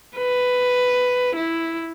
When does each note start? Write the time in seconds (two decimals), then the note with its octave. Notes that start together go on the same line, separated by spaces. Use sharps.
0.17 B4
1.35 E4